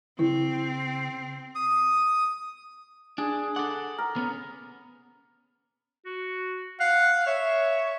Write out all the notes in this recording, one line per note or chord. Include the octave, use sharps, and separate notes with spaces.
C#3 C4 E4
D#6
D4 G#4
A4 F#5 D6
A#4
B3 C#4
F#4
F5 F#5
C#5 E5